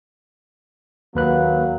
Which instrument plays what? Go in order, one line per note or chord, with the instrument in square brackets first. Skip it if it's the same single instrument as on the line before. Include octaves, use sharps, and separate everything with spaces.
[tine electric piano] D#2 B4 F#6 [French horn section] F#3 A#3